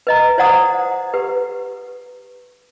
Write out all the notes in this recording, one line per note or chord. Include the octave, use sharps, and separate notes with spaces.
B4 D#5 A#5
F4 C5 D5 F#5 A#5 D#6
G4 B4